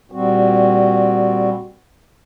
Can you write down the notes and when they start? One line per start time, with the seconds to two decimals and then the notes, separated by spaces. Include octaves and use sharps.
0.12 A#2 G3 C4 F#4